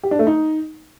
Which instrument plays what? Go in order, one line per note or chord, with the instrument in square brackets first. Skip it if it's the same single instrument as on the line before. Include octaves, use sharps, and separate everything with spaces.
[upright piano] G4
D4
A3
D#4